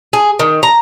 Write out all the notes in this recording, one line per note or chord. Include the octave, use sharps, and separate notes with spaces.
G#4
D#3
A#5